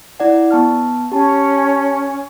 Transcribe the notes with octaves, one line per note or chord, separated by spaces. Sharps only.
E4 D5 F#5
B3 A5 F6
C#4 G4 A5